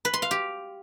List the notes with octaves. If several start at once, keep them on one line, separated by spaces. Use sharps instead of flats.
B4
C6
F5
G4